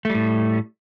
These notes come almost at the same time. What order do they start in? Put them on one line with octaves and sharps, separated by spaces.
A3 G3 A2